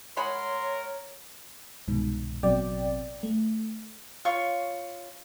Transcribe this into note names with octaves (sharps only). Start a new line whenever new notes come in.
G#3 A#4 C#5 F#5 B5 C6
C2 G#2 B2 D#3
A1 B2 F#3 C4 D5 G5
A3
F4 C#5 C#6